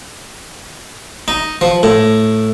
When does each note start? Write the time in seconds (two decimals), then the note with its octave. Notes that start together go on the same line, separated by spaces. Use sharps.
1.28 D#4
1.61 F3
1.83 A2